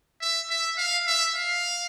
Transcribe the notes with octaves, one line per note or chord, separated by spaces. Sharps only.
E5
E5
F5
E5
F5